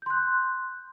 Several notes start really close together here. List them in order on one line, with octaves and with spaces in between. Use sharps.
G6 C6 F#6